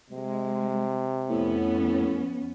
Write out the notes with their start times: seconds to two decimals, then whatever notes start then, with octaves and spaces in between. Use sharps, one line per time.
0.10 C3 G#3
1.30 F2 A2 B3 C#4